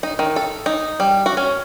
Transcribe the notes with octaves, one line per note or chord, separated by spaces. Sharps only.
D#4
D#3
A4
D#4
G3
F#4
C#4